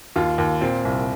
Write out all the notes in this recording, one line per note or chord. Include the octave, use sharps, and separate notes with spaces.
D#2 F4
D#2
A#2 C4
C2